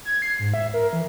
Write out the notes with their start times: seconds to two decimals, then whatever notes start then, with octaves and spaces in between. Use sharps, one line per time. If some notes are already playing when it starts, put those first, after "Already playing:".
0.05 G#6
0.22 C7
0.39 G#2
0.54 E5
0.74 A#4
0.93 E3